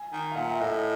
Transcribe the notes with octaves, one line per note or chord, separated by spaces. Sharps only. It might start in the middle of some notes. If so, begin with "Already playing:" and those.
Already playing: G#5
D#3
F5
A#2 F#5
E5
A2 D#5